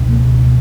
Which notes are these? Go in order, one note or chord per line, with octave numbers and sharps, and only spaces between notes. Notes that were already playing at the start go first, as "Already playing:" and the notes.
Already playing: C#2 B2
A#3